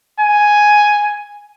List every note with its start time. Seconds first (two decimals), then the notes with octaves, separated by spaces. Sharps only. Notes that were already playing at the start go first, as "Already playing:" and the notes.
0.20 G#5